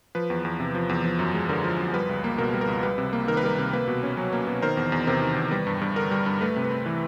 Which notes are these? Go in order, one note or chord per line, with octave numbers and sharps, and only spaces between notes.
F3 B4
E2
E2
C3
F3
E2
F3
F#2
G#3
D3 A#4
F3
F#2
G3 B4
C#2
A#3
B2 A#4
G3
A#4
C#2
G3 B4
C3
A#3
D#3 A#4
B4
G3 A#4
C3
A#3 B4
B2
C#4
F#3
A#3
B2
D#3 A#4 C5
E2
E2
C3 A#4 C5
D#3
E2
G3 B4
G2
G2
D3 A#4
G3
G2
A3 B4
C3
B4
C4
E3